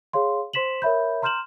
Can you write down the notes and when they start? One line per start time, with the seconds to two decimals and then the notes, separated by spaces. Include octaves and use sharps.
0.13 G#4 C#5 F5 C6
0.53 C5 C6 B6 E7 F#7
0.82 A#4 C#5 E5 B5 G6
1.22 A#5 C6 F6 G6 E7 F#7